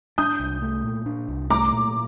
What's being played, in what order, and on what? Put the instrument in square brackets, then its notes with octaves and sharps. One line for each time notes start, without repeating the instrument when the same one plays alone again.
[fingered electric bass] D4 [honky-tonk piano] D#6 G6
[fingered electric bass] C2
A3
A#2
D4
C2
[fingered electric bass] A3 [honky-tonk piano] A#5 D6
[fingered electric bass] A#2